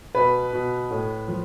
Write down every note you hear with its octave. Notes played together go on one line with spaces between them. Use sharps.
B2 B4
B2
A2
F3